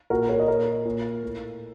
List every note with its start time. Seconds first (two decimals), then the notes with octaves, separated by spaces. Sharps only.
0.10 A#2 F#4 A#4
0.29 A#4 C#5
0.39 D#5
0.48 A#2 A#4 C#5
0.85 A#2
1.23 A2